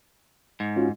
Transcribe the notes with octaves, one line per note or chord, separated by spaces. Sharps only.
G#2
C#4 F4 F#4